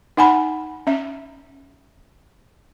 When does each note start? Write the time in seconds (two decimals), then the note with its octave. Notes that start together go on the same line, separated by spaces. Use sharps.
0.17 D#4 F#5 G#5 B5
0.87 C#4 E5